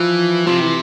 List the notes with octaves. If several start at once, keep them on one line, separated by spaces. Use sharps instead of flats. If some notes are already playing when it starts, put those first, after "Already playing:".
Already playing: E3 F3
C3 F3
E3